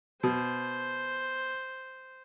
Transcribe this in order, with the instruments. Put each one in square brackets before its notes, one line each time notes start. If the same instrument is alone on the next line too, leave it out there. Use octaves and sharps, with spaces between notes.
[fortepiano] B2 [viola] C5